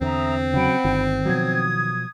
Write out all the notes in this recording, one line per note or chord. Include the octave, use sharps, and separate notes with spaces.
E2 D3 C4 E5 A#5 D#6
C#3 F#3 F#5 G5 B5
G1 D#3
B2 F3 F#3 D#6 G#6